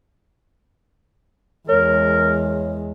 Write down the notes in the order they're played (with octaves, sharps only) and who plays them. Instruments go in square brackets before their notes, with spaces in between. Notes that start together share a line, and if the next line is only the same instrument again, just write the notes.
[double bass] E2 G#3 [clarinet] A#4 [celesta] C#5